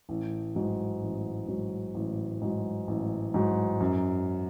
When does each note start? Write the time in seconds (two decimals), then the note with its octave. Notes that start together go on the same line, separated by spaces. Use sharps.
0.09 A1
0.55 G#2 F#3
1.02 A1
1.48 G#2 F#3
1.95 A1
2.41 G#2 F#3
2.88 A1
3.34 G#2 F#3
3.80 F#2